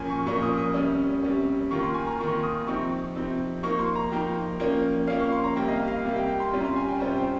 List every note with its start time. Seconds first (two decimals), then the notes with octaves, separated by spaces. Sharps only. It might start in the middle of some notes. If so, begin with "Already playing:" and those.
Already playing: A#2 F3 A#3 C#4 G#5
0.10 C#6
0.26 A#2 F3 A#3 C#4 C#6
0.42 D#6
0.58 D#6
0.74 C3 G3 C#4
1.23 C3 G3 C#4
1.71 D#3 A#3 F4 C#6
1.83 C6
1.94 G#5
2.07 A#5
2.19 D#3 A#3 F4 C#6
2.43 D#6
2.67 C3 F3 C4 D#4 C#6
3.15 C3 F3 C4 D#4
3.63 F3 A#3 D#4 C#6
3.79 C6
3.95 A#5
4.12 F3 A#3 D#4 G5
4.60 F3 A#3 C#4
5.07 F3 A#3 C#4 F5
5.20 C#6
5.32 C6
5.44 A#5
5.56 C3 G3 A#3 G5
5.68 D#5
5.72 F5
5.88 F5
6.05 C3 G3 A#3
6.16 G5
6.28 G5
6.40 C6
6.53 C3 G3 C#4 F4
6.60 A#5
6.64 C6
6.76 G#5
6.88 G5
7.00 C3 G3 C#4 F4 C5
7.17 G5